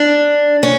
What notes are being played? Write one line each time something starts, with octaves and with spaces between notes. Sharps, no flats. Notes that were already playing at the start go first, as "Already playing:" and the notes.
Already playing: D4
C#4